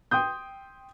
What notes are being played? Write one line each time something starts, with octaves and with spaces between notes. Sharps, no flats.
G5 C6 D#6 G6